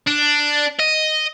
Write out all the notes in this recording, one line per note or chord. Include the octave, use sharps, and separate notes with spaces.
D4
D#5